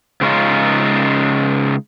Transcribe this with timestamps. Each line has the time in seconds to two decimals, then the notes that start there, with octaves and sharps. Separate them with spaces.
0.21 C#3 G#3 C#4 D#4 F4